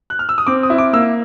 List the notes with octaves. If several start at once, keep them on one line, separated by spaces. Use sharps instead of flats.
F#6
F6
E6
D#6
C4 D6
D#6
E4
D6
A#3 E6